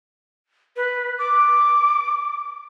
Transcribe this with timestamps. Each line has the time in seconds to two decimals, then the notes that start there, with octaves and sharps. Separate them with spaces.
0.76 B4
1.19 D6